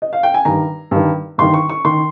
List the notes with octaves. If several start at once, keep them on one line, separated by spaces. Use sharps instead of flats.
D#5
F5
G5
G#5
G2 D#3 A#5
G2 D#3
G2 D#3 C6
C#6
C#6
D#3 C6